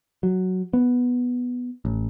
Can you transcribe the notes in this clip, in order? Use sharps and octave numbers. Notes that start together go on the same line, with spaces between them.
F#3
B3
A1